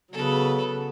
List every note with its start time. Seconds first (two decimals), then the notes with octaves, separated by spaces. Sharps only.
0.13 C#3 F#3 B3 A4 B4